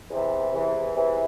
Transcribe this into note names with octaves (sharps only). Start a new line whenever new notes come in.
E2 C3 E3
E2 C3 E3
E2 C3 E3